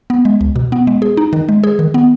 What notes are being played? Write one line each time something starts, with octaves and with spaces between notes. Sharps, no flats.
B3
G#3
C#2
B2
B3
G#3
G#4
D#4
D#3
G#3
G#4
D#3
B3